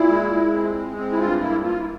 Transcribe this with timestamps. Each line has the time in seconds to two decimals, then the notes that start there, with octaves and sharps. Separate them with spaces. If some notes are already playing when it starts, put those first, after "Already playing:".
Already playing: A#2 E4
0.09 G#3
0.31 G#3
0.53 C4
0.75 G#3
0.97 C4
1.12 E4
1.19 G2 F4
1.40 A#3 E4
1.63 A#3 F4
1.80 E4